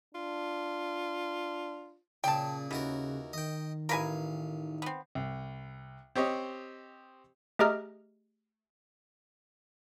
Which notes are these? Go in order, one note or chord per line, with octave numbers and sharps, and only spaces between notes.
D4 F4
A#2 C#3 G#4 D5 G5 A5
D#2 C#3 E3 F#4 A#4
D#3 D#5 G5
A1 A#4 B4 F5 G#5
B3 C4
C2
C4 G4 C#5 D#5
A3 G4 G#4 D#5 A#5 F6